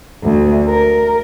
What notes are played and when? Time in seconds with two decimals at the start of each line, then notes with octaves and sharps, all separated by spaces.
0.23 D2
0.68 A#4